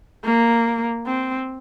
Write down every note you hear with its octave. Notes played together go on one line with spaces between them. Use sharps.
A#3
C4